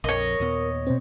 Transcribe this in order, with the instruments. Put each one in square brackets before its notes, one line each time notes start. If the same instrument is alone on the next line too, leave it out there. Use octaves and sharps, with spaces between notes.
[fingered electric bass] A#1 F2 [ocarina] A#4 [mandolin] C#5 D#5
[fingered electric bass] D#2 A#2 B3
[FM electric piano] B2 C4 [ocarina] C5